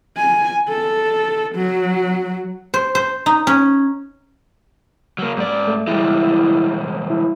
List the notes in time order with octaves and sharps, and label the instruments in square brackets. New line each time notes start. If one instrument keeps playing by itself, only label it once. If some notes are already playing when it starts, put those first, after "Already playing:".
[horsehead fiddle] G#5
A4
F#3
[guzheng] C5
C5
D#4
C#4
[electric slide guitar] F#3 A#3
G#2 D5
[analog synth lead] A3
[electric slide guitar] E3 G3 G#3 [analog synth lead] E4
[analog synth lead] E4